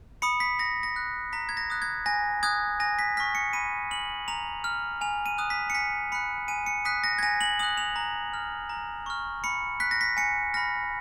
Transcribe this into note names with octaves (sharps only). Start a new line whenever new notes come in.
B5 D#6 C#7
B6
B5 A#6
A#6
F#6
A#5 B6
G#6
A#6
D#6 F#6
G#6
G#5 A#6
D#6 F#6 G#6
G#5 A#6
B6
C#6 F6 B6
C#7
B5 D#7
F6 F#7
A#5 F7
F6
G#5 F7
D#7
D#6 F#6
B6
C#7
G#5 B6
B5 F#6 C#7
G#5 D#7
C#7
D#6 F#6 B6
A#6
G#6
G#5 A#6
F#7
D#6 F#6 F#7
F7
A#5
F6
A#5
C#6 F6
B5 C#7
F#6 B6
A#6
B6
G#5 C#7
B5 F6 A#6